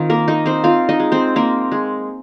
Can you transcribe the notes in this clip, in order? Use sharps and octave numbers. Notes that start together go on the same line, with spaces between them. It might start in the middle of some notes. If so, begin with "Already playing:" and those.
Already playing: D#3 C4 D#4 F4
A#3 A#4
A#3 D#4 D#5
C4 C5
C4 F4 F5
D#4 D#5
G#3
C4 C5
A#3 C4 A#4
G#3